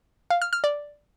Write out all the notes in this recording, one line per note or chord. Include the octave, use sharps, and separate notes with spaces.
F5
F6
F6
D5